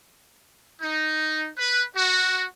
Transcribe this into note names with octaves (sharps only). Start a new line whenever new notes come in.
D#4
B4
F#4